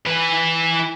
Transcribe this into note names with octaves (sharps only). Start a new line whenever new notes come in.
E3 B4